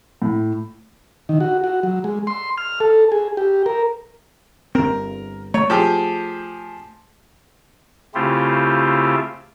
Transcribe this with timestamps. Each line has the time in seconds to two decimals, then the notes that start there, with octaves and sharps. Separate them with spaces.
0.22 A2
1.29 D#3
1.41 F#4
1.64 F#4
1.83 F#3
2.04 G#3
2.27 C6
2.58 F6
2.80 A4
3.12 G#4
3.37 G4
3.66 A#4
4.75 G1 C4 A#4
5.54 A3 C#5
5.70 F3 G4 G#4
8.15 C#3 A3 C4 E4 F4 G4